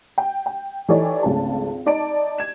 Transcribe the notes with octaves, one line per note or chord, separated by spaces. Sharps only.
G5
G5
E3 D#4 G4 A4 C#5 D5
G#1 C#2 A3 A5
D#4 D5 A5 D7
G#6 E7